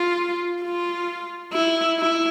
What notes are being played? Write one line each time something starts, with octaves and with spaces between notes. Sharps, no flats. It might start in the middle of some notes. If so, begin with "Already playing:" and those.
Already playing: F4
F4
E4
E4